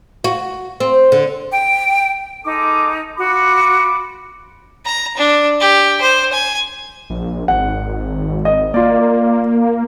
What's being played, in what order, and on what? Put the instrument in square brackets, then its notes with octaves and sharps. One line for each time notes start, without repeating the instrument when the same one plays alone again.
[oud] F#4
C4
D3
[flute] G5
[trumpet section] G#3 A4 D6 [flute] D#4
[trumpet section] F4 B5 D6 [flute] F#4
[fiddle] A#5
D4
G4
C5
G#5
[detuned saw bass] A#1
[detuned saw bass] G#1 [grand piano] F#5
[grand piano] D#5
[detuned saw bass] A#3 [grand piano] F4 D5